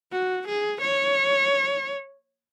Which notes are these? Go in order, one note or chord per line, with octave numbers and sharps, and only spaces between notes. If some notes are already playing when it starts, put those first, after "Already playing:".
F#4
G#4
C#5